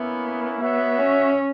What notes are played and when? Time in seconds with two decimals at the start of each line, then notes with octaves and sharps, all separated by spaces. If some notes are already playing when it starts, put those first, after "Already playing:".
Already playing: A#3 B3 C#4 E4
0.61 B3 F#4 C#5 E5
0.99 C#4